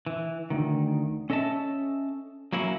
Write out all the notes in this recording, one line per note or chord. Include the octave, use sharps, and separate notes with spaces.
E3
D2 D#3
C#4 A4 D#5 E5 A5
F#3 A#3 C#4 E4